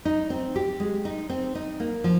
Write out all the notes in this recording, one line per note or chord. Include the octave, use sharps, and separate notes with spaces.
D#4
C4
G4
G#3
D#4
C4
D#4
A#3
F3